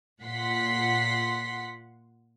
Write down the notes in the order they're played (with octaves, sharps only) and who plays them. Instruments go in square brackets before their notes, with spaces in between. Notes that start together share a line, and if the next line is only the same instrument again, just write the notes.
[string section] A#2 F#5 C6 B6